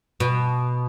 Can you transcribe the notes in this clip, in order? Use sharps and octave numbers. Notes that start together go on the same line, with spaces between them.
B2